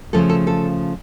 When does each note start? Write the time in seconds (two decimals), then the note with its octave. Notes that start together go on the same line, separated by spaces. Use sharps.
0.13 C#3 F3 A3 A4
0.29 A4
0.47 A4